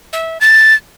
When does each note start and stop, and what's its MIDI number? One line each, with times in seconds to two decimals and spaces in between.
0.13 0.38 76
0.41 0.74 93